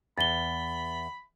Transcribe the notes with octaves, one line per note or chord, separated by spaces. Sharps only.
E2 B5 A6 G7